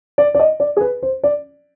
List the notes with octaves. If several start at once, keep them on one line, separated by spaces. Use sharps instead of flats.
D5
D5
D#5
D5
G#4
B4
C5
D5